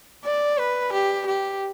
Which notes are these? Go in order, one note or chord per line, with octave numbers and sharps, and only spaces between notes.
D5
B4
G4
G4